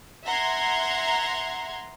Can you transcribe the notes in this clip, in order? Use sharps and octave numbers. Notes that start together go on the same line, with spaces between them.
E5 F#5 A#5 C6 G#6